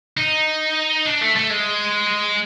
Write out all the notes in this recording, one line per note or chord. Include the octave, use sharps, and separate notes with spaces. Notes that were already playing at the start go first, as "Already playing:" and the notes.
D#4
D4
A3
A3
G#3